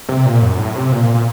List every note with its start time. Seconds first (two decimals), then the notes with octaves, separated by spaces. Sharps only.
0.09 C3
0.26 A#2
0.42 F#2
0.59 A2
0.76 C3
0.92 A#2
1.03 A#2
1.15 A#2